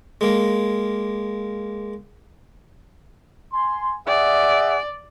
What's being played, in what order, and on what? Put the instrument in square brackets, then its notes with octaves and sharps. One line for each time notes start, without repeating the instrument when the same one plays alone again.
[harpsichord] G#3 A#3
[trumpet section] G#5 C6
[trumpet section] G#4 E5 F#5 [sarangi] D5